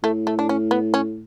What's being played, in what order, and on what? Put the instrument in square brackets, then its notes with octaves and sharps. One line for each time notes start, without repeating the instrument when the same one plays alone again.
[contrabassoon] A2 [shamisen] A3
[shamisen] A3
D4
C#4
B3
C#4